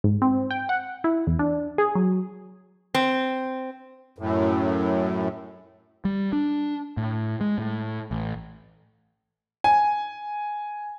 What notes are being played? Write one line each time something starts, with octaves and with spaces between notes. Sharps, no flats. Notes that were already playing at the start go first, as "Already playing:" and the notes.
G#2
C4
G5
F#5
E4
E2
D4
G#4
F#3
C4
F#2 A2
G3
D4
A2
G#3
A2
A1
G#5